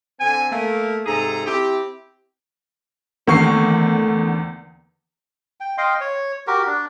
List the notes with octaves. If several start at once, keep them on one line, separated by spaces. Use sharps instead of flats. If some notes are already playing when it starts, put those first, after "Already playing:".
D3 C4 G#5
A3 A#3
G#2 C3 G#4 A4 A#5
C4 E4 G4
E2 D3 D#3 A3 A#3 C4 C#6 C7
G5
D#5 F5 G5 C6
C#5
F#4 G4 A#4
D4